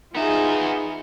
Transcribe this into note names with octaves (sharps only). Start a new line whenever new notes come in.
B3 D#4 F4 G#4 E5